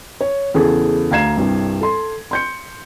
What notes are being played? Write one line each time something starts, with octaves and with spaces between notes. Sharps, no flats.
C#5
E2 C#3 G#4 A4
D2 F5 A#5 G#6 C7 E7
C2 G2
A4 C6
C6 G6 C#7